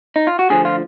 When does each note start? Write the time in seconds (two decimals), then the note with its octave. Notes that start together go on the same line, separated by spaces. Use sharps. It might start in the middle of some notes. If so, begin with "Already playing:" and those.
0.16 D#4
0.27 F4
0.39 F#4
0.50 D2 D3 F3 G#4
0.65 F4